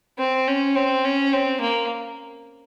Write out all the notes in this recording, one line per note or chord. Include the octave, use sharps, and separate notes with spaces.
C4
C#4
C4
C#4
C4
A#3